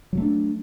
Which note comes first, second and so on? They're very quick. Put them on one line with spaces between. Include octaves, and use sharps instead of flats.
F#3 A3 D4